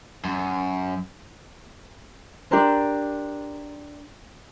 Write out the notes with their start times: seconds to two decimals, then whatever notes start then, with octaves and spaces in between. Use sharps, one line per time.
0.25 F#2
2.51 D4 G4 A#4 C5